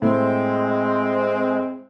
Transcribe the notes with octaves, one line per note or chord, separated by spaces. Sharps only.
A2 G#3 C4